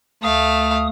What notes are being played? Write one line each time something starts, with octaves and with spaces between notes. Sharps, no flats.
D2 A3 F5 D#6